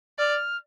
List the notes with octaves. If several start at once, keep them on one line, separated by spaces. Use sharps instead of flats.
D5 F6